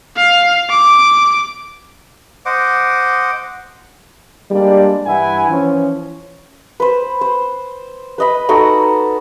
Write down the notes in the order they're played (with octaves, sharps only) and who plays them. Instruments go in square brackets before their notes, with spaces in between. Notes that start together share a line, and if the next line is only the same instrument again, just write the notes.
[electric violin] F5
D6
[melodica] C5 D#5 F#5 D6
[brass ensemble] G3 G#3 A#3 D4 D5
G2 E3 E4 F#5 G#5
E3 F3 C#4
[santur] B4 C5
C5
B4 D#5 B5
D#4 F#4 A4 F#5